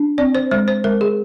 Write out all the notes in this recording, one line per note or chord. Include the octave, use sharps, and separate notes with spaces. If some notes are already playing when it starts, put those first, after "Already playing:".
Already playing: D4
C4 D5
C5
G#3 C5
C5
G#3 A#4
G#4